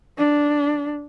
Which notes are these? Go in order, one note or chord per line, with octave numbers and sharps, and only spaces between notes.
D4